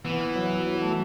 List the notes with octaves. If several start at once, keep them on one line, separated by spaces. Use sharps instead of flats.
E3 B3
F#3
F#3
A3